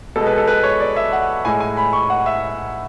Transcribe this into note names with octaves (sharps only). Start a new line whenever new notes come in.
B2 G#3 A4
B4
A4
B4
C#5
D5
E5
F#5
A2 G#3 G#5
G#5
B5
C#6
F#5
E5